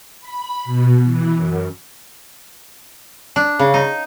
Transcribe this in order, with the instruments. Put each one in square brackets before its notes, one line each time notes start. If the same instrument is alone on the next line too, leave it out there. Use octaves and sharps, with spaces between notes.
[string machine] B5
B2
E3
F#2
[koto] D4
C#3
D#4